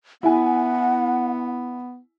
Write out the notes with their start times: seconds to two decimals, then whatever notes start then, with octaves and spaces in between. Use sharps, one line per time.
0.23 B3 E4 F#5 G#5